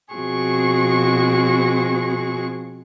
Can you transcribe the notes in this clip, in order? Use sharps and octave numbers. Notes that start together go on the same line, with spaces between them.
B2 F3 C4 F#4 G#4 C#6